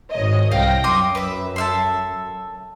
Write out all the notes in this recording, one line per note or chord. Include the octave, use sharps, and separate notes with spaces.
G#1 C#5 D#5
C2 F5 G5 A#6
F#2 C6 D6 D#6
B4 E5
A4 E5 C6